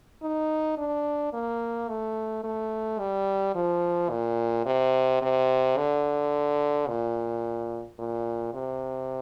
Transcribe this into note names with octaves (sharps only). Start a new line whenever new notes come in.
D#4
D4
A#3
A3
A3
G3
F3
A#2
C3
C3
D3
A#2
A#2
C3